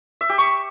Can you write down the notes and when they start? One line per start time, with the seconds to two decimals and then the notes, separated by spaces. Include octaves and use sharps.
0.21 E5
0.29 G4
0.38 C#6